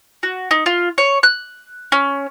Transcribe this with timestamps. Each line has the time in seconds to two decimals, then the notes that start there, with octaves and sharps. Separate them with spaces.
0.23 F#4
0.51 D#4
0.66 F4
0.98 C#5
1.23 F#6
1.92 C#4